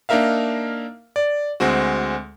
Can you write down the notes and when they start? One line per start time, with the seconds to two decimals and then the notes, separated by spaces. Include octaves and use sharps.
0.09 A#3 D4 D#4 A#4 E5 F5
1.16 D5
1.60 D2 G#3 C4 F#4